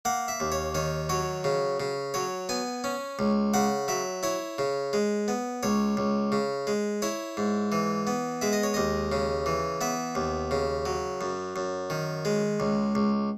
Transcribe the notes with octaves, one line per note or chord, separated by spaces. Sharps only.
A#3 F#5
E5
D#2
C#5
D#3 C#5
F#3 C#5
C#3
C#3
F#3 C#5
B3 G#5
C#4
C#2
C#3 F#5
F#3 E5
E4 C#5
C#3
G#3
B3
C#2 C#5
C#2
C#3
G#3
E4 C#5
G#2
E3
B3
G#3 E5
D#5
C#5
D#2 D#5
C#3
E3
B3 E5
D#2
C#3
F#3
F#2
F#2
D#3
G#3
C#2
C#2